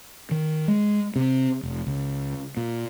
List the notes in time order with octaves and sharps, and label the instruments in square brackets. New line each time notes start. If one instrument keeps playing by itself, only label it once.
[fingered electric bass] D#3
G#3
C3
F1
C#2
A#2